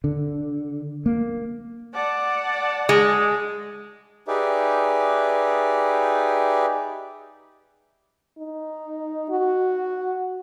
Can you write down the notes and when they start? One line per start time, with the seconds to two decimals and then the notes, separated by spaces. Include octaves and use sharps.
0.04 D3
1.06 A#3
1.92 D5 F#5 A5
2.89 G#3
4.28 D#4 G4 G#4 B4 D5 E5
8.38 D#4
9.30 F#4